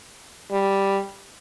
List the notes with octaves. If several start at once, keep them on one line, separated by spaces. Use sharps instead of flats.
G3